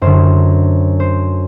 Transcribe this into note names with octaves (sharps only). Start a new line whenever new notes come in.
F#2 D3 C5
C5